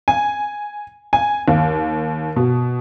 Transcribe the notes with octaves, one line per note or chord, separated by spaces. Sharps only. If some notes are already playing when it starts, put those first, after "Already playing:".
G#5
G#5
D#2
B2